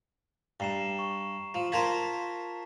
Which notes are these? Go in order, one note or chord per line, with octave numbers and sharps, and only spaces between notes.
G2 A#5 C7 E7
C#6
F3
F4 A#4 C5 A5 G#6 B6